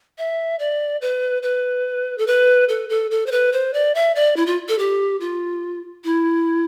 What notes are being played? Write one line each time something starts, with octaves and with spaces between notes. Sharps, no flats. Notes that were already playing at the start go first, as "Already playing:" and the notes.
E5
D5
B4
B4
A4
B4
A4
A4
A4
C5
B4
C5
D5
E5
D5
E4
F4
A4
G4
F4
E4